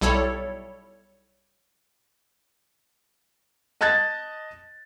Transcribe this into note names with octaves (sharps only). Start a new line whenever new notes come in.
B1 G3 E4 A4 C#5
D#5 A5 F#6 G#6 A6